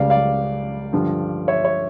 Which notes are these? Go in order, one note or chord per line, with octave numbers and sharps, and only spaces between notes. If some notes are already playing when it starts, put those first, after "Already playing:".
Already playing: C#2 C#3 G3 D5 F5
D5 F5
G2 D3 F3
C#5 E5
C#5